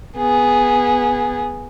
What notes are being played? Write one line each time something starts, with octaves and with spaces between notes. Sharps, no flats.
B3 G#4